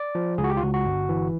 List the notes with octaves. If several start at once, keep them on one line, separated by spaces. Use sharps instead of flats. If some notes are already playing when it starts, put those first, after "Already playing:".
Already playing: D5
F3
C#2 G#4
F#4
G4
F4
C#2 F#4
F#4
G1
E3